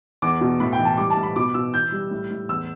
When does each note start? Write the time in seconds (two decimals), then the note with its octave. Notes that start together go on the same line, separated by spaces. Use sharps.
0.22 E2 D6
0.41 B2
0.60 A2 B5
0.72 G5
0.79 E3
0.85 A5
0.97 G3 D6
1.10 A5
1.17 A2
1.23 B5
1.36 B2 D6
1.54 B2 E6
1.73 E3 G6
1.92 G3
2.11 A2
2.30 A2
2.49 E2 E6